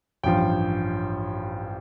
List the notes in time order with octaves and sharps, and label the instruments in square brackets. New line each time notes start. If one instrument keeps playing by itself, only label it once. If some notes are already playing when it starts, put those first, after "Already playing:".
[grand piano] A1 G2 F3 G5